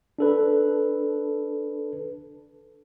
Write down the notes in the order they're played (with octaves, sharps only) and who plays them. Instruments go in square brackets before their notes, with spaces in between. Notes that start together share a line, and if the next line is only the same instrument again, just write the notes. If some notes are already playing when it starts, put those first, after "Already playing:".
[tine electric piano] D4 A4 B4